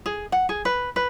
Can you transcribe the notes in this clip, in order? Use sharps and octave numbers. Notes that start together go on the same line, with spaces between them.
G#4
F#5
G#4
B4
B4